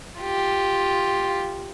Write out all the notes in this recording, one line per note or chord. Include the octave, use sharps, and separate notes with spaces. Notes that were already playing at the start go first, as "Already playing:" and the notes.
F4 G4